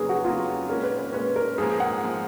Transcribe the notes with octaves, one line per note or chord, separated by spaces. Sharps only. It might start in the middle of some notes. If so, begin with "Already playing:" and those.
Already playing: F2 C#3 F#3 A#3 G#4 B4
F#4
F2 C#3 F#3 A#3 F4
A#2 G#3 C#4 A#4
B4
B4
A#2 G#3 C#4 B4
A#4
G#2 F3 A#3 G#4
F#5
F3 A#3